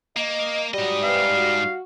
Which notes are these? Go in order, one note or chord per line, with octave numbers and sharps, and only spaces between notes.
A#3 D#5
G#2 F#3 G3 D#5
C4 E4 B4 F5
F#4